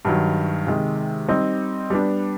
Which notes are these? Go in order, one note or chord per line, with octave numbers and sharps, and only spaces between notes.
G2 D#3 F#3
C3 D#3 G#3
G3 C4 D#4
G3 B3 D4